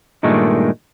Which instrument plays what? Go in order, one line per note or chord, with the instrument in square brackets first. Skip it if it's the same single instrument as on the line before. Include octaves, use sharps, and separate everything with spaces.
[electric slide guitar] G2 A#2 D#3 G#3 A3